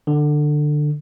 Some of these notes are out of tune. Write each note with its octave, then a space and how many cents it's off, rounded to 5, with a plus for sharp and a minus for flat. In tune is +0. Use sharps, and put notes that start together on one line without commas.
D3 +20